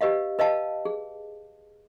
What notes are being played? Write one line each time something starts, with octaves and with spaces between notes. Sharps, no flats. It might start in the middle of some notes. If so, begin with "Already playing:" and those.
G4 B4 D#5 F5
B4 D#5 F5 A5
G#4